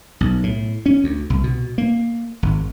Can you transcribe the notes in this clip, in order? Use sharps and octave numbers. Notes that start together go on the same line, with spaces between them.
B1
A2
C#4
D2
C2
B2
A#3
G#1